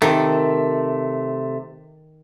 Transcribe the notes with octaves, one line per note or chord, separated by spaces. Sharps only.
C3 D#3 A3